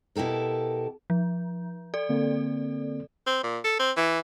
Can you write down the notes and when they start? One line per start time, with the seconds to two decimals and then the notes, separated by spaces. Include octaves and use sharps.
0.16 B2 E4 G4 A4 A#4
1.10 F3
1.94 A4 D5
2.09 D3 A#3 C4
3.26 C4
3.43 A#2
3.64 A4
3.79 C4
3.96 E3